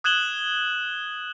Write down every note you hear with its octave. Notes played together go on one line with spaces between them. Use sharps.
D#6 F#6 G#6 E7 F#7 G7